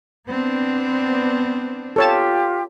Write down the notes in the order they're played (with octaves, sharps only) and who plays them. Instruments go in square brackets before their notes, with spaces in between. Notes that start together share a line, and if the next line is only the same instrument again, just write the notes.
[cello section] B3 C4 D4
[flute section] F4 G4 [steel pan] A4 C#5 A5